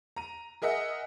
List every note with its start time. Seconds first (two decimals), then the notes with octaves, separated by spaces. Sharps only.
0.16 A#5 D#7
0.62 G#4 A#4 D#5 E5 F#5